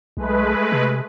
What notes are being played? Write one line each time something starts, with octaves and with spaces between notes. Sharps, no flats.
B1 G#3 A3 B4
C3